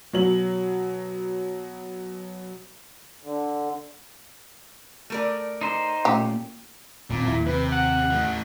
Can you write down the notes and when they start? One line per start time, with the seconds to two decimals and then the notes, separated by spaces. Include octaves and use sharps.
0.13 B2 F#3 F#7
3.23 D3
5.10 A3 A#4 D5
5.61 D#4 C5
6.05 A#2 A3 C#4 G4
7.10 D#1 A#2 C4
7.27 D#2 E4
7.46 C3 B4
7.72 F#5
8.10 E3 A3